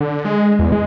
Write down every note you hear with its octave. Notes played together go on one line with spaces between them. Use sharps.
D3
G#3
E2
G#3